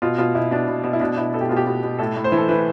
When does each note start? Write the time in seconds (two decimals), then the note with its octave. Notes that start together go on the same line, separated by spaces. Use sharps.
0.02 B2 F4
0.18 B2 F4
0.35 B2 E4
0.51 B2 D4
0.68 B2
0.84 B2
0.93 E4
1.00 B2 D4
1.17 B2 E4
1.33 B2 A4
1.41 G4
1.49 B2 F4
1.57 G4
1.67 B2
1.83 B2
1.99 A2 A4
2.16 A2
2.24 C5
2.32 E3
2.37 A4
2.48 E3 B4